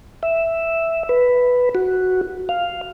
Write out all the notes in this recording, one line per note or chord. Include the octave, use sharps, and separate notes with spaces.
E5
B4
F#4
F5